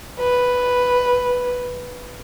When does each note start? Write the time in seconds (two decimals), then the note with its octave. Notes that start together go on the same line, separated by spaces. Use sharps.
0.20 B4